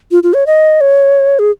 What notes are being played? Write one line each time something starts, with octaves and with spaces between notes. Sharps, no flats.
F4
F4
C#5
D#5
C#5
G#4